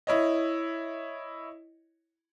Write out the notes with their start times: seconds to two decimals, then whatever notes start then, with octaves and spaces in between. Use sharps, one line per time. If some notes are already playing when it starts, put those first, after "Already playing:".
0.07 E4 C#5 D#5